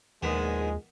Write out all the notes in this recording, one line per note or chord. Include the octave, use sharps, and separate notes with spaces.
A#1 D#2 D#3 G#3 B3